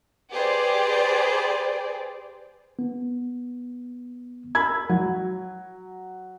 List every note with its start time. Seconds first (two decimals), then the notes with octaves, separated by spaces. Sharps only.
0.30 G4 G#4 B4 C5 D5
2.79 B3
4.55 A#4 B5 E6 G#6
4.89 F#3